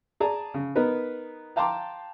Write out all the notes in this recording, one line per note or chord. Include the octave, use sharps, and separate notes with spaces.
G#4 D5 A5 A#5
C#3
B3 D#4 A#4 B4
F5 G5 A5 A#5 C6 D6